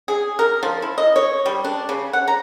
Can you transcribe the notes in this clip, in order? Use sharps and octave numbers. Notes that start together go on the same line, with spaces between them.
G#4
A#4
F3
E4
D#5
C#5
G3
D4
C#3
F#5
A#5